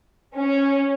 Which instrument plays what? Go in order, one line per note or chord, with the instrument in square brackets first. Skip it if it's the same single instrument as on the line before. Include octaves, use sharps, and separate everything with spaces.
[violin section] C#4